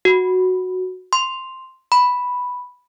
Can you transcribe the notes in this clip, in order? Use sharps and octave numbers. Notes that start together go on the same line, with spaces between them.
F#4
C6
B5